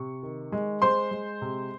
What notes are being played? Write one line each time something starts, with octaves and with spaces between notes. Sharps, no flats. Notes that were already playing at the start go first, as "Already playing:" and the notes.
Already playing: C3 C#6
D#3
G#3
G#3 C5 C6
G#3
C3